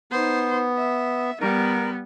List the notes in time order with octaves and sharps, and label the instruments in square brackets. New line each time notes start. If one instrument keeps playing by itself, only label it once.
[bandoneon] B3 [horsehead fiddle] D#4 C5
[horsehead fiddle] E5
[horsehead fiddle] G3 B3 [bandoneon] A#4